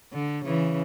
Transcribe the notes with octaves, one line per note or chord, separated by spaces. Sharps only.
D3
C#3 E3